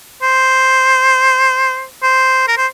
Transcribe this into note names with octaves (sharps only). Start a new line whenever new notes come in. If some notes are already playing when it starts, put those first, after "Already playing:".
C5
C5
A#4
C5